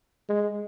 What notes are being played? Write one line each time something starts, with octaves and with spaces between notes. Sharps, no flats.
G#3